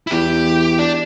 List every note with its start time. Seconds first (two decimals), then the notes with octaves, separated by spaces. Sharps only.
0.07 E4
0.11 E2 G4
0.79 D4